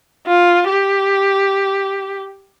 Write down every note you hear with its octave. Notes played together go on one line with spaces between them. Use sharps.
F4
G4